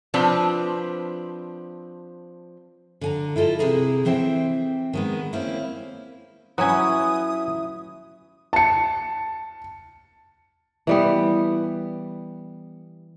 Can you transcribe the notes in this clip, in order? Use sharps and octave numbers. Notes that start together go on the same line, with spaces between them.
F3 C4 D4 B4
D3 G#5 A#5
E4 F4 A4 D#5
C3 D#3 E4 G#4 B4 A#5
E3 C4 C5 E5 G5
D#3 G#3 B3
A#3 C4 C#4 E4
F#3 C#4 E4 B4 G#5 D#6
A5 C#7
E3 G3 B3